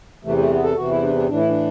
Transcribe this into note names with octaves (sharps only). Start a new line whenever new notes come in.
E2 C3 E3 A3
A3
B3
A4
E2 C3 E3 F#4
E4
D4
D4
A2 E3 D4
E4
D4